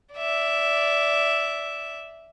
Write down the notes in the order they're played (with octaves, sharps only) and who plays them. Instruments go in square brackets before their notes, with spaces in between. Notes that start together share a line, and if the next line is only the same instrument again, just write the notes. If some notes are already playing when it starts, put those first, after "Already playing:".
[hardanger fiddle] D5 E5